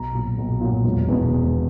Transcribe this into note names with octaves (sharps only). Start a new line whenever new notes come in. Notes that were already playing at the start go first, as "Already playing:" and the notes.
Already playing: B1 A#5
A#2 F#3
B1
A#2 F#3
E1
E2 B2
E1